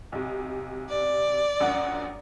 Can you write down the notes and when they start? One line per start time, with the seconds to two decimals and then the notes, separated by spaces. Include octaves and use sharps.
0.12 B1 C3
0.89 D5
1.60 A#1 F#2 F#5